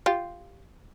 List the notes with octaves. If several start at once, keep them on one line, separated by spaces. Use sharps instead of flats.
F4 G4